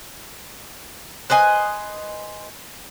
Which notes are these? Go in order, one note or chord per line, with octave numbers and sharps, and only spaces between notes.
B4 C5 D#5 G#5